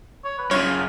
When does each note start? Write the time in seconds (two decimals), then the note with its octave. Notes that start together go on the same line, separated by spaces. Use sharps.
0.24 C#5
0.38 B4
0.51 F#2 C#3 F4 C#5